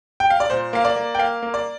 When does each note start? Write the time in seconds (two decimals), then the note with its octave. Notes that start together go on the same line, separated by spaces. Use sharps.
0.20 G5
0.30 F5
0.40 D5
0.50 A#2 C5
0.73 A#3 F5
0.85 D5
0.96 A#3
1.15 G5
1.19 A#3 F5
1.43 A#3
1.54 D5